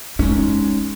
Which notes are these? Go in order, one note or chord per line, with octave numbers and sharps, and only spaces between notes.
G#3 C#4 D#4